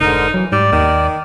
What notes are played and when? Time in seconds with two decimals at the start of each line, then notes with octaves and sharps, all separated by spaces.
0.01 F1 G#2 D3 D#4 A#4
0.34 E3 F#3
0.52 G#2 G3 D5
0.72 D#2 D#3